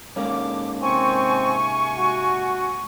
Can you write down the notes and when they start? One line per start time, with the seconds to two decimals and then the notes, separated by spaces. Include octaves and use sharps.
0.16 G#2 A#3 C#4 D6
0.82 C3 C4 G#5 C#6
1.96 F#4